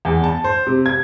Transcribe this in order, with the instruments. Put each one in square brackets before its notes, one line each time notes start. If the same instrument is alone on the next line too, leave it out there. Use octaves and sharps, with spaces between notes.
[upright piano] E2
A5
C5
C3
G#6